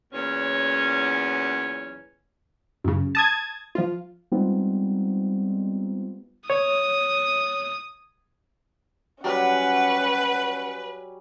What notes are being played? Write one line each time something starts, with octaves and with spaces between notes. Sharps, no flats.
E2 A#2 F#3 C#4
F#2 C#3
A5 D#6 G#6
F3 F4
G3 G#3 B3 C4 D#4 F4
C#5 D#6
F#3 G3 C#4 B4 F#5 G#5